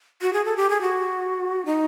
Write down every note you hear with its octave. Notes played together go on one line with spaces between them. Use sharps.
F#4
G#4
A4
G4
G#4
F#4
D#4